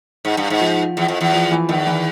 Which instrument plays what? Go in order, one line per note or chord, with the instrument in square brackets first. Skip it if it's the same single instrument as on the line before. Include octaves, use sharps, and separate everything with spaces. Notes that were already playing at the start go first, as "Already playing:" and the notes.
[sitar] G#2
G2
G#2
[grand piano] F3
[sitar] E2
F2
E2
[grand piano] F3
E3
[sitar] E2 [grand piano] D#3
[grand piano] E3